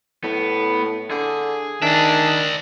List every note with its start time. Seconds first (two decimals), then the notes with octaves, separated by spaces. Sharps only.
0.24 A2 B3
1.10 D3 G#4
1.82 D#3 D4 D5 E5